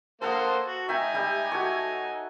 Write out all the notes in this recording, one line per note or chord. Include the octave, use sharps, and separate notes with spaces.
A#3 A4 C5 F#5 D#6
F#4
D#4 E5 G5 G#5 A#5
G3 G4 E5
F#4 A4 C#5